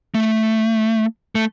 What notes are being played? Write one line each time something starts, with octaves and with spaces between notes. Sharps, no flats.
A3
A3